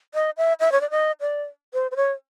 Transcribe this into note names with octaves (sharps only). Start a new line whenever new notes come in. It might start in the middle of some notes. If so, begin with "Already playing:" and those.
D#5
E5
E5
C#5
D5
D#5
D5
C5
C5
C#5